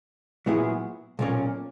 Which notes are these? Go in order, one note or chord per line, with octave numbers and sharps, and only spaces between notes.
A#2 F#3 B3 E4 G#4
B1 A#2 A#3 C#4